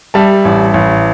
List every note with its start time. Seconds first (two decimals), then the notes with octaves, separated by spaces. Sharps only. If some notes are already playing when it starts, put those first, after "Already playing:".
0.14 G3 E5 A5
0.45 A1
0.74 A1